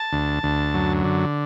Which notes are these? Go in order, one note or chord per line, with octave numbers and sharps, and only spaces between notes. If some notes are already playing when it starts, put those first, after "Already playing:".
Already playing: A5
D2
D2
F#2
D3